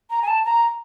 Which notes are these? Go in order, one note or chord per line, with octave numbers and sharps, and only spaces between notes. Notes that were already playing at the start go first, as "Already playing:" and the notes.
A#5
G#5
A5
A#5